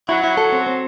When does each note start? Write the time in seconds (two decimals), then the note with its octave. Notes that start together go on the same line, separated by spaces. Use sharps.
0.09 F#3 E4
0.24 E4
0.37 A4
0.53 C4
0.67 C4